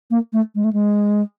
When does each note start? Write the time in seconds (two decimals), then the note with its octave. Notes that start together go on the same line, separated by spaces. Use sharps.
0.10 A#3
0.33 A3
0.55 G#3
0.64 A3
0.73 G#3